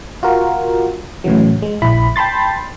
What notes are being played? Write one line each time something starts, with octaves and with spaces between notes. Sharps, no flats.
F4 F#4 A#4
A2 C#3 E3 F#3
G#3
A#1 E4 B5
G5 A5 B5 C6 A6